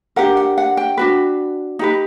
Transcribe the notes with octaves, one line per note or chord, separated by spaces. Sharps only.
D4 G4 A#4 F#5
F#5
F#5
G5
D4 F#4 B4
D#4 G4 B4